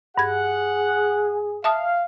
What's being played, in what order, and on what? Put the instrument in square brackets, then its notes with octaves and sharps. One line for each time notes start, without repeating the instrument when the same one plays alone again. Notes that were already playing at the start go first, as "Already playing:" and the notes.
[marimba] G2 G#6 [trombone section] G#4 [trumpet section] F#5
[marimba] E5 A5 D#6 [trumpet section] F5